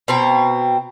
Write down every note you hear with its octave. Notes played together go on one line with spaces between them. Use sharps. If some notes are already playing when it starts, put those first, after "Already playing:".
B2 C4 A#5